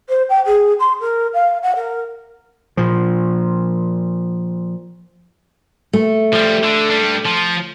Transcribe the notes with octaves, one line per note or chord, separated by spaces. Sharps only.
C5
G5
G#4
C6
A#4
F5
F#5
A#4
A#2 F3
A3
F3 G3
D3
G3 D4
F3